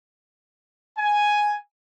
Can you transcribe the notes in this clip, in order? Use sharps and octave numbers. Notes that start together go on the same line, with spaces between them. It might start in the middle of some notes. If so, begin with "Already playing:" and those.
G#5